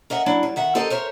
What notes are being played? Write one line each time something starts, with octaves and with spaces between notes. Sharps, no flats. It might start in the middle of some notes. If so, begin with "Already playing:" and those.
A#4 D#5 E5 F#5
F#3 D4 E4
G3
D#3 E5 F#5
C4 G4 A4 A#4 D#5
A#4 C5 C#5 E5